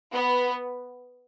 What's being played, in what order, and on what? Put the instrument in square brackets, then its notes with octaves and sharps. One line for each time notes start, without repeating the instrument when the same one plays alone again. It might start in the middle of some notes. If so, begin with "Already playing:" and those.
[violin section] B3